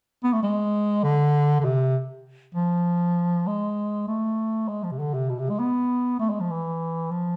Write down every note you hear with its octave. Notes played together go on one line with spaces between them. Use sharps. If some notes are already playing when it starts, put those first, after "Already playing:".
B3
A3
G#3
D3
D3
C3
F3
G#3
A3
G#3
F3
C3
D3
C3
B2
C3
G#3
B3
A3
G#3
F3
E3
F3